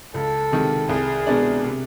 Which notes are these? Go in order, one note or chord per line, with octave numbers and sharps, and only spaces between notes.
C#2 A4
C3 D#3 G#3
C2 G#4
B2 G#3 B3 D4
C3